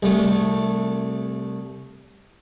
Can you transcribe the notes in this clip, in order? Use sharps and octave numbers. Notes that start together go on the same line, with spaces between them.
C2 A3